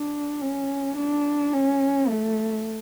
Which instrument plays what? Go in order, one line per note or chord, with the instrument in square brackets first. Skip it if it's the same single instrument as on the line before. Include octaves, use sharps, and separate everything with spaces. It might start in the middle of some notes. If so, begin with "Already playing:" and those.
Already playing: [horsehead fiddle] D4
C#4
D4
C#4
A3